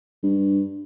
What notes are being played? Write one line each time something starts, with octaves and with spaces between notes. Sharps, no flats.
G2